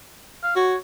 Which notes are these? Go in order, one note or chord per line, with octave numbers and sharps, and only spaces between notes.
F5
F#4 C#5